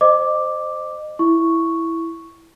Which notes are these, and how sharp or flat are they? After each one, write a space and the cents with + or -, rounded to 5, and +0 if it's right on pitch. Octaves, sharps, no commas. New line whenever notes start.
C5 +0 D#5 -25 D6 +0
E4 +0 C#6 +0